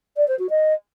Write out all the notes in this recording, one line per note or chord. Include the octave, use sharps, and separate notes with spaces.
D5
C5
F#4
D#5